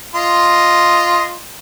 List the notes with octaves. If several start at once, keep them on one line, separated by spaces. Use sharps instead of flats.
F4 D#5 C6